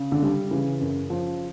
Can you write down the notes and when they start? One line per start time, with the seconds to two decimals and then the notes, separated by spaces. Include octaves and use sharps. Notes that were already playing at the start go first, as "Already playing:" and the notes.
Already playing: C#3
0.12 D3
0.22 G3
0.51 C#3 E3
0.81 F#2
1.10 F3